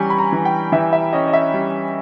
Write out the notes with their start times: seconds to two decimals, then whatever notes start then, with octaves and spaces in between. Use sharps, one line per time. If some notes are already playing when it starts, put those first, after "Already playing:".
Already playing: E3 G3 C#4 G#5 A#5 C#6
0.10 B5
0.18 A#5
0.32 E3
0.45 G5
0.72 E3 E5
0.93 E5
1.13 C#4 D#5
1.28 D#5
1.33 E5
1.54 G3